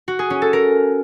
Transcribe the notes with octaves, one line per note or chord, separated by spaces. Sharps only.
F#4
G#4
C#4
A4
A#4